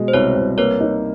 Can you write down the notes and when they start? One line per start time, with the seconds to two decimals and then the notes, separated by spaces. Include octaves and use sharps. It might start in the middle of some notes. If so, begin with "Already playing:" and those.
Already playing: B2 G#3
0.08 C5
0.13 C2 B4 C#5
0.36 C2
0.57 A#3 B4 C#5
0.80 D#4